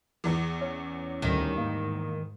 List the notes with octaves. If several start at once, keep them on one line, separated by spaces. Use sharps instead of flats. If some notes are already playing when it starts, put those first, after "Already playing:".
E2 E3
C#4
D2 D#3 G3
G#2 A#3